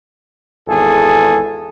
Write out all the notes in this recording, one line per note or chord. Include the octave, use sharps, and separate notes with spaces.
G#1 E2 G#4 A4